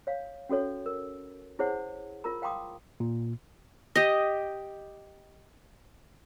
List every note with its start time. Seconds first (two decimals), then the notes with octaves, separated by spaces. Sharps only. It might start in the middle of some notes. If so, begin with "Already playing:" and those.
0.07 C#5 F5
0.49 C#4 F#4 A4 C#5
0.86 A#4
1.59 E4 G#4 C5 C#5 F#5
2.24 F4 A#4 A#5
2.42 F5 G5 A#5 C6 D6 D#6
3.00 A#2
3.96 G4 D#5